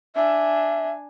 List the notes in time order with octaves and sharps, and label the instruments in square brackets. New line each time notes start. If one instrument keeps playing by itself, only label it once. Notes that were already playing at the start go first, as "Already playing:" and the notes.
[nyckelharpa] D4 G#5 [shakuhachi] E5